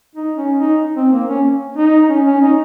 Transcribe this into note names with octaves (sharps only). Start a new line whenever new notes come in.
D#4
C#4
D#4
C4
A#3
C#4
D#4
C#4
C#4
D#4